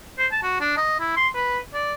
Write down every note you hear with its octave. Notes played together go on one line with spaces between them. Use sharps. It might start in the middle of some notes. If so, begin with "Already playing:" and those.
C5
A5
F#4
D4
D#5
E4
C6
B4
D5